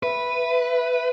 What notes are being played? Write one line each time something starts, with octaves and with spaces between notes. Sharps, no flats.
B4 E5